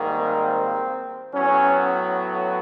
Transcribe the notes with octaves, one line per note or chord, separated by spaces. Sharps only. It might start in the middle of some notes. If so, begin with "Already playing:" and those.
Already playing: G#2 D#3 G3 A#3
C4
A2 F#3 B3 C#4